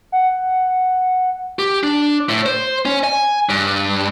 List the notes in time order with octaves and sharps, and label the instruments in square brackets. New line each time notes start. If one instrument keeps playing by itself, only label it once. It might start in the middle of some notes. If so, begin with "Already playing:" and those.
[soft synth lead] F#5
[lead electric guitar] G4
D4
A2
C5
C#4
G#5
G2